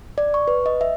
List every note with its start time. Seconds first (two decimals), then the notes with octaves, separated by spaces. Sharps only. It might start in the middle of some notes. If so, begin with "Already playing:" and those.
0.18 D5
0.34 C#6
0.47 B4
0.66 D#5
0.81 E5